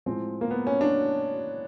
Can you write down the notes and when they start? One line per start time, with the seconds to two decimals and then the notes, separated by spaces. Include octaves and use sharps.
0.06 A2 F3 G#3 C4
0.41 A#3
0.51 B3
0.67 C#4
0.81 D4